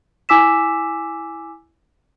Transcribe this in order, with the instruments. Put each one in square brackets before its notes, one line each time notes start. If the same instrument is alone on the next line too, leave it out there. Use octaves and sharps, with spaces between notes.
[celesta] E4 G#5 D6 E6 B6 E7